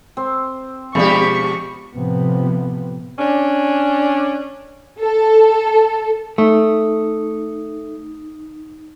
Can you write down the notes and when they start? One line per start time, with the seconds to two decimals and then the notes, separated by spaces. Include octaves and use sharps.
0.17 C4
0.95 B2 F3 G#3 D4 G4 B5 C#6
1.94 A2 C3 F3 B3
3.19 C#4 D4
4.99 A4
6.38 A3 D#4